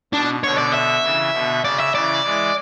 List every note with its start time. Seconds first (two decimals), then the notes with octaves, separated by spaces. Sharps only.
0.13 B2 D4
0.43 B2 D3 C#5
0.58 D5
0.74 E5
1.03 C#3 E3
1.33 B2 D3
1.63 C#3 D5
1.80 E5
1.94 C#3 E3 D5
2.24 E3 G#3